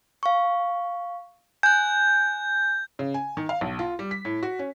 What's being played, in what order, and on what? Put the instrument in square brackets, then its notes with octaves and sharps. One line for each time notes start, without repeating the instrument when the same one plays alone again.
[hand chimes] F5 C#6
[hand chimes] G#5 F#6 [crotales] G6
[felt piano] C#3
G#5
D#3
F5
B1
F4
G3
B6
A2
F#4
C#4